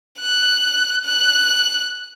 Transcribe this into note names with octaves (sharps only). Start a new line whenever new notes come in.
F#6
F#6